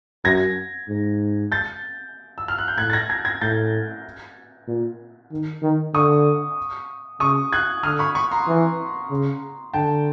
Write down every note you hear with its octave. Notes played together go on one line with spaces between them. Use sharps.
F#2 G#6 A#6
G#2
G6 A6
E6
F6
F#6
G6
A2 F#6 G#6
A6
G#6 A#6
G#6 A#6
G#6 A#6
A2 G6 A6
A#2
D#3
D#3
D3 C#6 D#6
C#3 C#6 D#6
F#6 G#6
D3 D#6 F6
B5 C#6
B5 C#6
A#5 C6
E3
C#3
D3 G5 A5